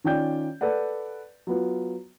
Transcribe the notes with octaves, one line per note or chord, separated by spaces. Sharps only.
D#3 C#4 F4 D5 G5 G6
A4 B4 D5 F#5
F#3 B3 F4